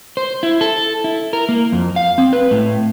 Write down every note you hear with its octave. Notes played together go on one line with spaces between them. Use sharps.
C5
E4
A4
E4
A#4
A#3
F2
F5
C4
B4
A2